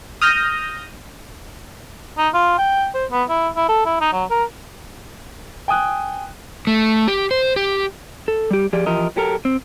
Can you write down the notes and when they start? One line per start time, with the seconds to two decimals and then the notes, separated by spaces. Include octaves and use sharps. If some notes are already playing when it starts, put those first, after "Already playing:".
0.22 D#6 F6 G6 A#6
2.17 D#4
2.34 F4
2.58 G5
2.94 C5
3.11 B3
3.30 E4
3.56 E4
3.69 A4
3.86 E4
4.01 D#4
4.13 F#3
4.30 A#4
5.68 G5 G#5 D#6 F#6
6.67 A3
7.08 G4
7.31 C5
7.56 G4
8.28 A4
8.51 G3 G4
8.73 F3 G4 G#4 D5
8.86 E3 F3 G4 A#4 D#5
9.16 F#3 G4 A4 A#4
9.45 C4